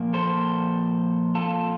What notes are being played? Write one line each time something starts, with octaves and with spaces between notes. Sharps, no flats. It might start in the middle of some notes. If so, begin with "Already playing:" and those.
Already playing: A#2 F3 A#3
A4 C5
F4 A4